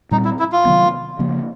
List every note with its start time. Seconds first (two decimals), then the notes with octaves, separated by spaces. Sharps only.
0.11 A#2 G3 C4 D#4
0.25 E4
0.39 E4
0.52 F4
0.65 C3 D#3 F#3 B3
1.19 C#3 F3 A#3